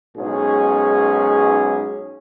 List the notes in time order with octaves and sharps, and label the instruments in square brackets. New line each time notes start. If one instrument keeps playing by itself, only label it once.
[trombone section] B1 G#2 C#4 G#4